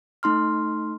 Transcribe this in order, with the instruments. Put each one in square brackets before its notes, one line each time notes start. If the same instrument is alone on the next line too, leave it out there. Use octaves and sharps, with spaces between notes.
[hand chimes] A3 D#4 C6 F6